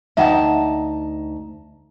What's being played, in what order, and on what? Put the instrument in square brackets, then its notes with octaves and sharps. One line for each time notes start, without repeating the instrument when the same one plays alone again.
[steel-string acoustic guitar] D2 D#4 A5 [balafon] E5 F#5 G5